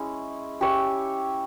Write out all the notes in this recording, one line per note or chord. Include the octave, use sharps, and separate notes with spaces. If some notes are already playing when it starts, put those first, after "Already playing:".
Already playing: G#3 C#4 E4
C#4 G4 C#5 E5